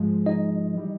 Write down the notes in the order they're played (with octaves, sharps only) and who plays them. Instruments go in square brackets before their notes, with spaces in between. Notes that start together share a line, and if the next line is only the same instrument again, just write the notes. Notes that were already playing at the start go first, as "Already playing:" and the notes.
Already playing: [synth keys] G#2 F3 G#3
[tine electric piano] D#4 D#5
[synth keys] E3 G3